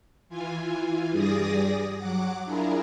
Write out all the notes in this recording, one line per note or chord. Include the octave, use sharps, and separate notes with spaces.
E3 F4 G#5
G2 G3 G#4 D5 D#6 A#6
F#3 F#5 D6
D4 E4 F4 G#4 A#4